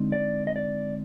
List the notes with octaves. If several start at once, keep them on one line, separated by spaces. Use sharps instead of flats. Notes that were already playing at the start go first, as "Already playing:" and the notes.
Already playing: D3 G#3 C4 D#4
D5
D#5
D5